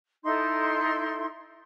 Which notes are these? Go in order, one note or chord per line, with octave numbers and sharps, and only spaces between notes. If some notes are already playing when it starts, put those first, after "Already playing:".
D#4 E4 A4 C6